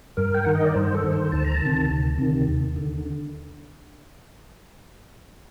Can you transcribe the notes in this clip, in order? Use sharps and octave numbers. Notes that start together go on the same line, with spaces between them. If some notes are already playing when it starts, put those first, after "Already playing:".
G2 A#4
G5
D#3 F#5
D#5
D5
G2 C5
A4
D#3
C5
D2 A5
A#5
A5
C3 D#3
D2
C3 D#3
D#2
D3